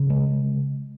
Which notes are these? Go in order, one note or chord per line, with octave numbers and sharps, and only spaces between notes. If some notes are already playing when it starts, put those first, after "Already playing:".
Already playing: C#3
G#3